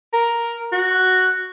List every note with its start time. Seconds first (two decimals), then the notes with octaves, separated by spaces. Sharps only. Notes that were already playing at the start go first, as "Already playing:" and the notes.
0.13 A#4
0.72 F#4